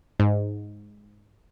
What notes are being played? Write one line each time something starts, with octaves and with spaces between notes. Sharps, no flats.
G#2